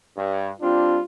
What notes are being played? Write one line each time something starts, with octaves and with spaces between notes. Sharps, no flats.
G2
G3 C4 D4 F4